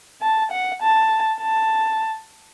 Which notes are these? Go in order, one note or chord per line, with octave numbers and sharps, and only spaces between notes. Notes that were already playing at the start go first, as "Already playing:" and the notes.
A5
F#5
A5
A5